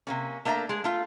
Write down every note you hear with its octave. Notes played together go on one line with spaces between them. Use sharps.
C3 A#3 C#4
A3 A#3 D4 E5 A#5
G#3 G#4
A3 F4 F5